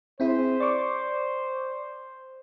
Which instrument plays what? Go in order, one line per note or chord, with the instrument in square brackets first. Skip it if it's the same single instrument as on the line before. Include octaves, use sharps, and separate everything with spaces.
[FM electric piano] C4 E4 G#4 [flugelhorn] C5
[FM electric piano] D5 C#6 D6